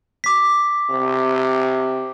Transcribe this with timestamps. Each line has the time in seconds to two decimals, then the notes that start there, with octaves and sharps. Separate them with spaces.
0.24 D6 B6
0.90 C3